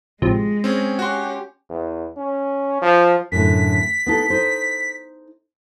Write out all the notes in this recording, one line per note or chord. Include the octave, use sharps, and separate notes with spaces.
A1 C3 F3 G#3
C4 C#4 G#4
C#4 F#4 G4 C6
E2
C#4
F3
F#2 A2 D3 B6
B3 D#4 A4
D#4 C5